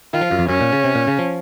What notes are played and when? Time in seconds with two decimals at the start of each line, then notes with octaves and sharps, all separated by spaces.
0.13 D#3 F4
0.21 F3
0.31 F#2
0.39 F2
0.49 F#2 C#4
0.61 A#2
0.73 C#3
0.84 C3
0.95 A#2
1.07 C#3
1.19 F3